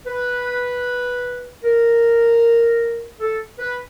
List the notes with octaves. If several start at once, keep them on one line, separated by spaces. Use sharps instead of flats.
B4
A#4
A4
B4